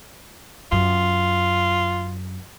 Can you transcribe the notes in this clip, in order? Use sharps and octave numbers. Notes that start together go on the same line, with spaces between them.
F#2 F4